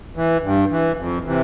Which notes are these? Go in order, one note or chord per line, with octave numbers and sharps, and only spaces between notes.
E3
G2
E3
F2
C3 E3